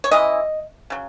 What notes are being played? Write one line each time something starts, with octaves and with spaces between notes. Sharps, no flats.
C#5
E3 G#3 C#4 E4 D#5
C#3 F#3